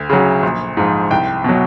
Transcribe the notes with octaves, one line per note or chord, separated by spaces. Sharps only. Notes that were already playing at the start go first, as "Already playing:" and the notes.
Already playing: D2
C#3 F#3
A#1
G#2 F3
C2 G5
B2 F#3